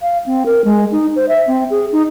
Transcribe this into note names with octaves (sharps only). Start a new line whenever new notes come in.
F5
C4
A#4
G#3
D#4
C5
E5
C4
G#4
D#4